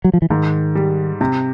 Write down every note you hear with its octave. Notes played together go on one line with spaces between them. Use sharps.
F#3
F3
E3
G#2 D#3
G3
C3